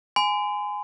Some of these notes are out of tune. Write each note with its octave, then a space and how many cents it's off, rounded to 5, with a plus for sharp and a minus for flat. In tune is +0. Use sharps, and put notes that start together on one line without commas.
G#5 +0 C6 -45